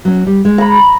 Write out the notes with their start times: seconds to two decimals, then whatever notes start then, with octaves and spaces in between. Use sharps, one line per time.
0.05 F#3 C#4
0.27 G3
0.45 G#3
0.58 A#5 B5